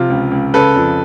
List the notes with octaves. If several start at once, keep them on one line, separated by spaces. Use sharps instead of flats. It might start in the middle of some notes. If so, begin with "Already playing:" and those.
Already playing: C3 F3 F4
C#2
C#2
C#3 A4 B4
F2